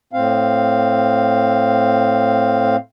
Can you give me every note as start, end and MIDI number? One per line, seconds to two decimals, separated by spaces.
0.13 2.76 45
0.13 2.76 60
0.13 2.76 77